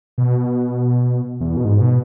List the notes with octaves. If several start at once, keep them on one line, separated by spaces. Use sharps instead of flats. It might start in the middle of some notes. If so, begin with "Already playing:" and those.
B2
E2
B2
G#2
B2